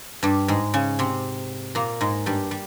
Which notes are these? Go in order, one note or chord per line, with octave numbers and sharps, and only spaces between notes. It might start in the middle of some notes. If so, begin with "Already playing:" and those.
G2 G3
G#2 G#3
C#3 C#4
C3 C4
A#2 A#3
G#2 G#3
G2 G3
G3